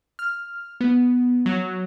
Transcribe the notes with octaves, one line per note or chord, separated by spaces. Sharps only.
F6
B3
F#3